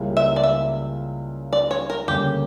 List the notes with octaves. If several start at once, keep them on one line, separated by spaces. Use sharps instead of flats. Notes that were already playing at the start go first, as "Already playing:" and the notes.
Already playing: C#2 C#3 G3 A#3 E4
E5
D5
E5
D5
C#5
A#4
D2 C#3 G3 A#3 C#4 G4